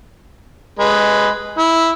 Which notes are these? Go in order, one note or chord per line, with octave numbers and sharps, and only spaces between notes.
G#3 B4
E4